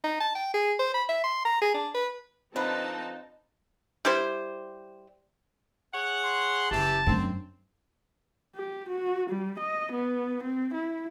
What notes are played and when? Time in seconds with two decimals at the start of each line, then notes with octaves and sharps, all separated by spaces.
0.04 D#4
0.20 A5
0.35 G5
0.54 G#4
0.79 C5
0.94 B5
1.09 E5
1.24 C6
1.45 A#5
1.61 G#4
1.74 D4
1.94 B4
2.56 D3 F3 C4 D#4 B4 C5 D#5 A5
4.05 G3 E4 G4 C5
5.94 G#4 C#5 F#5
6.25 C6
6.71 F#1 E3 G4 A5
7.06 F#2 C4 D4
8.56 G4
8.89 F#4
9.30 G3
9.59 D#5
9.92 B3
10.43 C4
10.74 E4